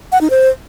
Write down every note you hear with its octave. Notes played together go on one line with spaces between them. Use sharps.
F#5
D#4
C5